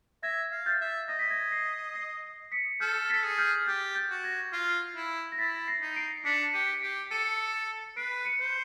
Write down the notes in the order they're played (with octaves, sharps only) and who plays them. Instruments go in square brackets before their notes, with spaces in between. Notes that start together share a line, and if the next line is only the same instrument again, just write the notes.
[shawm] E5 [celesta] G#6 A#6
[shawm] F5
[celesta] G6 A6
[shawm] E5
[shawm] D#5 [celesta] A#6
[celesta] B6
G#6 A#6
A#6 C7
A#6 C7
B6 C#7
[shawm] A4 [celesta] F6 G6
[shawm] A4 [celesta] A6 B6
[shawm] G#4
[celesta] F6 G6
[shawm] G4 [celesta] G6 A6
[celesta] G6 A6
[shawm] F#4
[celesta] G#6 A#6
[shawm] F4
E4
[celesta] A#6
[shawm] E4 [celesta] A6 B6
[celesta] A#6 C7
[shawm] D#4
[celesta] C7 D7
[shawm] D4 [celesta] B6 C#7
[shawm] G4 [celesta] C#7 D#7
[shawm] G4 [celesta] C7 D7
[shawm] A4 [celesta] C#7 D#7
[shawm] B4 [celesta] C7 D7
[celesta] C#7 D#7
[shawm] C5